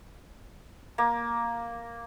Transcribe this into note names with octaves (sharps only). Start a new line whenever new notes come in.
A#3